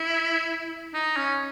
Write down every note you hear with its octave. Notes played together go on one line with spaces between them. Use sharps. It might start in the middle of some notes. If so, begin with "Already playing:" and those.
Already playing: E4
D#4
C#4